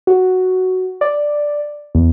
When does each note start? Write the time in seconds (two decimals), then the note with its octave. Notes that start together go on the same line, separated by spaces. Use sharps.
0.07 F#4
1.01 D5
1.95 E2